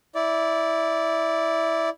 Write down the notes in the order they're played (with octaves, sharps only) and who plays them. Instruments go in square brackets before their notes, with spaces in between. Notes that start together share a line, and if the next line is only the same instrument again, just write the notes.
[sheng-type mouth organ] E4 D5